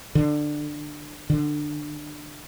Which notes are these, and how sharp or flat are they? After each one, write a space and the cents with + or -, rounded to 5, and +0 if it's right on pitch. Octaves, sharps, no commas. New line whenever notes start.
D3 +20
D3 +20